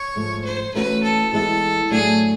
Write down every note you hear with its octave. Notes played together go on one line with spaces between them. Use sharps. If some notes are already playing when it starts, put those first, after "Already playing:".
Already playing: C#5
G#2 F3 A3
C5
E3 A3 C#4 F#4 B4
A4
E3 G#3 B3 E4 A4
A2 F#3 A3 D4 F#4 G#4